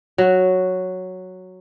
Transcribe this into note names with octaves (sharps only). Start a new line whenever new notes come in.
F#3 F#4